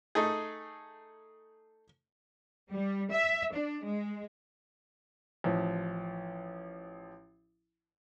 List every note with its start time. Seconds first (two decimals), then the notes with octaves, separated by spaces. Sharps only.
0.15 A3 D#4 G#4
2.72 G3
3.10 E5
3.53 D4
3.83 G#3
5.44 A1 F3